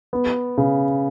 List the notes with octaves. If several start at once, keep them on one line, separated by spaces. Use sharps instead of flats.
B3
C#3